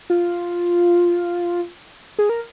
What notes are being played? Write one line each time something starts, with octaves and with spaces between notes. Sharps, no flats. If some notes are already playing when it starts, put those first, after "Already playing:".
F4
G#4
A#4